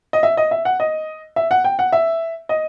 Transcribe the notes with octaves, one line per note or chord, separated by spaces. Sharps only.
D#5
E5
D#5
E5
F#5
D#5
E5
F#5
G5
F#5
E5
D#5